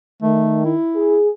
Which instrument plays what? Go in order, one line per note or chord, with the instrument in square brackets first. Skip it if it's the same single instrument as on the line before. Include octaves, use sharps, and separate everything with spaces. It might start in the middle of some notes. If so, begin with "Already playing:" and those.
[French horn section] D#3 [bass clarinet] A3
[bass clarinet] E4
[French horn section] G#4